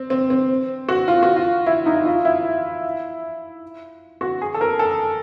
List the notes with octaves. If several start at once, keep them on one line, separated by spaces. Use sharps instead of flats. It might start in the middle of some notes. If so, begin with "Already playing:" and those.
Already playing: C4
C4
C4
F#4
F4
F#4
F4
E4
D#4
F4
E4
F#4
G#4
A4
A#4
A4